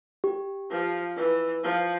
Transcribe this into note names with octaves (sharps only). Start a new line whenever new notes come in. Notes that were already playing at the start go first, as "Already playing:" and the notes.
G4
F3
E3
F3